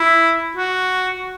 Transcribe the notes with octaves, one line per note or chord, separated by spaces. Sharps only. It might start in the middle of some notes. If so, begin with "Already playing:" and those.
Already playing: E4
F#4